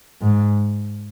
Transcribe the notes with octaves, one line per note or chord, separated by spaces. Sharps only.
G#2